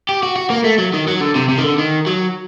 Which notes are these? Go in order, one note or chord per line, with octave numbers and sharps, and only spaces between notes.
G4
F#4
F#4
A#3
A3
F#3
D#3
F#3
D3
C3
C3
D#3
D3
D#3
F#3